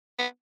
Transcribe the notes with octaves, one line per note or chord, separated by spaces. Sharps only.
B3